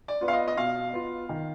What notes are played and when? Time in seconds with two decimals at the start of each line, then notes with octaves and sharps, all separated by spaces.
0.08 D5
0.21 B3 F4
0.28 F5
0.33 D#5
0.48 D#5
0.57 B2 F5
0.93 B3 F4
1.29 D#3